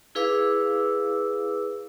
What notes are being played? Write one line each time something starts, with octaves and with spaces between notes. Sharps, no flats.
E4 G#4 B4 F5 D6 E6